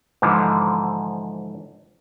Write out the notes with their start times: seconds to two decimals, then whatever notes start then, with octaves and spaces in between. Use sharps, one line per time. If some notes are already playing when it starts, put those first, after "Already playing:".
0.22 G#2 D3 E3 F3